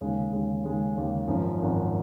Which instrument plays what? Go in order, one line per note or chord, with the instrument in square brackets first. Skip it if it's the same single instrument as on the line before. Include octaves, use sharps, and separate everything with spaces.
[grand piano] D#2 C#3 G#3
D#2 C#3 G#3
D#2 C#3 G#3
D#2 C#3 G#3
G#1 F#2 F3
G#1 F#2 F3